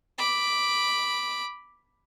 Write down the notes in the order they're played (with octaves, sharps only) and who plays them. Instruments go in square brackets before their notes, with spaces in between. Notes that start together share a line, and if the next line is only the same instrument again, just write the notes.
[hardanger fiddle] B5 D6